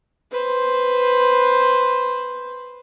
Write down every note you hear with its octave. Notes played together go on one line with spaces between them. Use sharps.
B4 C5